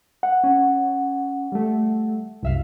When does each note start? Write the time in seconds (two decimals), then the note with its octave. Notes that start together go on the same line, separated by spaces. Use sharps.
0.23 F#5
0.44 C#4
1.52 G3 A3
2.43 C2 F#2 E5 F5